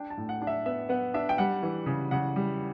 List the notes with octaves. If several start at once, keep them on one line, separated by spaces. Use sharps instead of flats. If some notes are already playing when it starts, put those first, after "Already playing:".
Already playing: D4 G5
A5
A2
F#5
D4
E5
B3 E5
B3 F#5
D4 E5
G5
G3 F#5
E3
C#3
C#3 F#5
G3